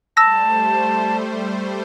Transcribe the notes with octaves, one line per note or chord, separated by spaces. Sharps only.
G3 A3 C5 A5 E6 A#6